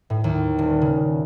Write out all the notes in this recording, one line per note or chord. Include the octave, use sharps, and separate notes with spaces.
A2
D#2
D#1
C#3